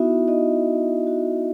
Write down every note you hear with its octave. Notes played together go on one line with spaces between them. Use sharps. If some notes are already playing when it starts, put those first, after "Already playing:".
Already playing: B3 D#4 E4 F#4 E5
D#4 D#5
F#4